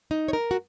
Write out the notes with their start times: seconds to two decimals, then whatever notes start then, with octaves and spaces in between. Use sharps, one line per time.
0.11 D#4
0.28 C#5
0.33 A#4
0.51 F#4